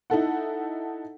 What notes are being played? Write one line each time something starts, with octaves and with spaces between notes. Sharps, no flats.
D#4 E4 A4 F#5